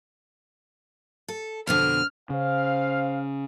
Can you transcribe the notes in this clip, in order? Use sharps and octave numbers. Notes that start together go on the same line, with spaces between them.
A4
F2 B2 D3 F6
C#3 C5 F5